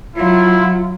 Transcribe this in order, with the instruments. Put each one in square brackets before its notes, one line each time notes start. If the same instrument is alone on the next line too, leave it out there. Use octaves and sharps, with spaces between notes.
[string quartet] F#3 [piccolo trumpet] E4 [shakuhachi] F4